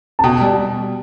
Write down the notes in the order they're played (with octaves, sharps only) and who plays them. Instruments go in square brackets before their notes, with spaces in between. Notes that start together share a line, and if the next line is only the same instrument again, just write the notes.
[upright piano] A5
[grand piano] B2 [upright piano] G5
[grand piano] G3